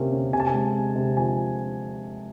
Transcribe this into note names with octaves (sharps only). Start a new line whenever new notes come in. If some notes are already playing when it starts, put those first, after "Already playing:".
Already playing: C3 A#3 C#4
C#4
C3 G#5
A5
G#5
G#3
C3
C3
F3 G#5